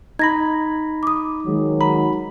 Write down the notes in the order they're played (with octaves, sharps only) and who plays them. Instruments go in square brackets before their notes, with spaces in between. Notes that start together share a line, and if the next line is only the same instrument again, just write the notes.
[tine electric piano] D#4 B5 [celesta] G#6 A#6
[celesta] D6 D#6
[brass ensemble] D#3 F#3 G#3
[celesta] A#5 [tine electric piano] B5